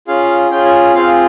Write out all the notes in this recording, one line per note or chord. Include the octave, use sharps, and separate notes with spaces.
C#4 F4 G#4 F5
C#4 F4 G#4 G5
G#5
C4 F4 G#4 F5